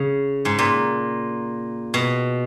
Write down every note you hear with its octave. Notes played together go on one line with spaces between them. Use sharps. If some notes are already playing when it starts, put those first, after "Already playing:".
Already playing: C#3
G#2
A#2
B2